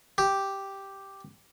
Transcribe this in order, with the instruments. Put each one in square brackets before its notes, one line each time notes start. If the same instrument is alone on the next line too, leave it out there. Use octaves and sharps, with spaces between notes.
[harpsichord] G4